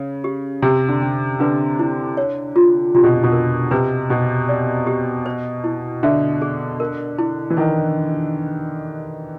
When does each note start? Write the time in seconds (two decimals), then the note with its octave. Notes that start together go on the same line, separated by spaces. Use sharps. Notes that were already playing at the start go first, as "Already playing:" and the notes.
Already playing: C#3
0.24 G4
0.62 C3 G4
0.89 D3
1.02 C#4
1.40 D3 B4
1.79 E4
2.17 C#5
2.56 F4
2.94 C3 F4
3.04 B2
3.23 B2
3.32 A#4
3.71 C3 B4
4.09 B2 D#4
4.49 D5
4.87 G4
5.26 C5
5.64 E4
6.03 D3 E5
6.42 G#4
6.80 A#4
7.19 E4
7.50 E3
7.57 D#3 E4